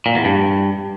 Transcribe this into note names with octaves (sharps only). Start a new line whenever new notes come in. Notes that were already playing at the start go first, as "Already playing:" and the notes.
A#2
E2
G2